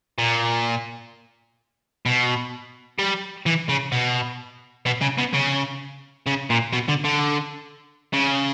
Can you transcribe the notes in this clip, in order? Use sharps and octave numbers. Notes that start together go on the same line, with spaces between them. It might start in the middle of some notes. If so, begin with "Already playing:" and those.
A#2
B2
G3
E3
C#3
B2
B2
C#3
B2
C#3
C#3
A#2
B2
D3
D3
C#3